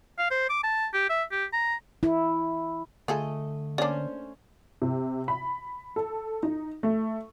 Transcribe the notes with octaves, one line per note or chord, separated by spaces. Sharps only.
F5
C5
D6
A5
G4
E5
G4
A#5
E4
D3 A3 F4 G#4 A4 D#5
A#3 C#4 D4 C5 D5
C3
B5
A4
D#4
A3